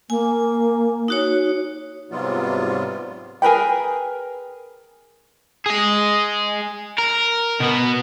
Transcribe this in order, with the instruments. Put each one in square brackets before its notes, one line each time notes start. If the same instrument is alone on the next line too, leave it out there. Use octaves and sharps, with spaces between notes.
[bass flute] A#3 [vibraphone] G#5
[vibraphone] D#4 F#4 C#5
[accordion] G#2 C3 F#3 G3 B3 F4
[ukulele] G#4 A#4 B4 G5
[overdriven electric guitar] G#4 D#5
A#4
B2 B3